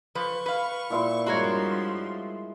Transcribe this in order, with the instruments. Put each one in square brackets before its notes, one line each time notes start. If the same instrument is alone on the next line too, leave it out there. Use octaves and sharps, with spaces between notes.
[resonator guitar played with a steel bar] F3 B4 [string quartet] C#6
[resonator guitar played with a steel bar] B4 F5
[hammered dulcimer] A#2 E4 C6
[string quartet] G2 F3 C6 [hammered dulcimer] G#3 [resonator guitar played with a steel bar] F#4 A#4 C#5